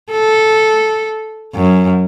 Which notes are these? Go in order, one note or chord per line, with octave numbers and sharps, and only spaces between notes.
A4
F#2